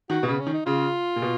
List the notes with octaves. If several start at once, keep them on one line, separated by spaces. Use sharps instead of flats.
D#3 F#4
B2
C#3 B3
C#4
D#3
D#4
C#3 F4
A#2
B2